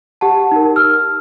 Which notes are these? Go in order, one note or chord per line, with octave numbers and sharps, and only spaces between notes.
G4 F#5 A5
D#4 A#4
E6 F6